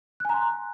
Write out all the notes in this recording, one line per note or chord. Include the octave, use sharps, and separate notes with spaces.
G#5 A#5 C6 F#6